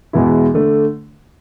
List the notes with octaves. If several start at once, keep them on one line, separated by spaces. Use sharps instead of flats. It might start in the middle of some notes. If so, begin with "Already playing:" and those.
E2 B2 G#3 B3 E4
D3 A3